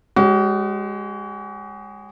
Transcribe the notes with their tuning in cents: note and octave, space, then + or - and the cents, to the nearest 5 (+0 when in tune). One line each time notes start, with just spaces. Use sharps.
G#3 -15 F#4 +40 C#5 +0